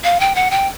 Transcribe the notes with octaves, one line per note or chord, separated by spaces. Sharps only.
F5
G5
F#5
G5